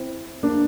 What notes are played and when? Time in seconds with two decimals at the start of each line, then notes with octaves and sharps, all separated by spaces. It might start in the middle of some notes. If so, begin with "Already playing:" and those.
Already playing: C4 E4
0.43 A#3 D4